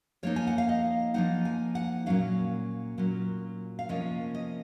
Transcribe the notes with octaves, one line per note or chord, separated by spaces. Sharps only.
F3 A#3 D#4 C#5
G#5
F#5
F5
D#5
F3 A#3 D#4 F#5
G#5
F#5
A#2 F#3 C#4 F5
A#2 F#3 C#4
F5
C3 F3 A#3 C#4 D#5
D#5